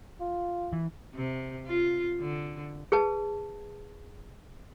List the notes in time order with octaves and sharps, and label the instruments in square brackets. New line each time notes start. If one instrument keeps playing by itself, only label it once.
[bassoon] F4
[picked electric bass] E3
[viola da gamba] C3
F4
D3
[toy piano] G#4 B4 A5